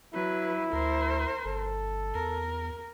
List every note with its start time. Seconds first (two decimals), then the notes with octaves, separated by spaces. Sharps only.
0.14 F#3 E4 B4
0.73 D2 A#4 C5
1.45 G1 A4
2.15 E2 A#4